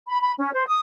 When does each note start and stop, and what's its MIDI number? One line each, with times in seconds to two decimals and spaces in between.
0.08 0.21 83
0.22 0.33 83
0.39 0.53 61
0.54 0.64 72
0.68 0.80 87